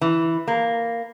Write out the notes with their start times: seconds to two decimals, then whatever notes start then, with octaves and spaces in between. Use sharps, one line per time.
0.01 E3
0.48 A#3